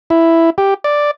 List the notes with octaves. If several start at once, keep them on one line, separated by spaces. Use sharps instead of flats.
E4
G4
D5